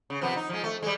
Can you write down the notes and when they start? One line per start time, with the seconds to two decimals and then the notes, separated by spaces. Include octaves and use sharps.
0.10 C#3
0.21 C3 F3 B3
0.36 D#4
0.49 F3 G#3
0.64 A3
0.82 G3 G#3